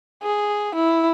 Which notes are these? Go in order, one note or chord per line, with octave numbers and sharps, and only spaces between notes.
G#4
E4